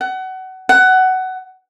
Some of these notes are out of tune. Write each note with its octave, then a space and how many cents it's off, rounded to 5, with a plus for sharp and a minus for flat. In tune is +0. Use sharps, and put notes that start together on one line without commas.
F#5 +25
F#5 +15